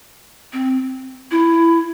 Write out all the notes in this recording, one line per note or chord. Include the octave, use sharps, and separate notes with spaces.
C4
E4